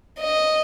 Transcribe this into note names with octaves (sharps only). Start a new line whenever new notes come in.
D#5